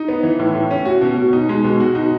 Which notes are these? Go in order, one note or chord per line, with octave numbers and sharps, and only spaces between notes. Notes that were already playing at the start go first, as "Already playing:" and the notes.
Already playing: D#4
B3
E3
A2
A2
C#4
F#4
B2
B2
D#4
G#3
B2
F#4
D#4